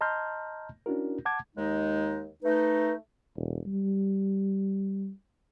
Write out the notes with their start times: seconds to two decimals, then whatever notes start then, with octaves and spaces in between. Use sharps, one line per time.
0.01 D#5 A5 A#5 C6 F6 G6
0.86 C#4 D4 E4 F#4 A#4
1.25 F#5 A5 D6 G#6
1.56 D#2 G#3 D#4
2.43 A3 D#4 B4
3.36 E1
3.66 G3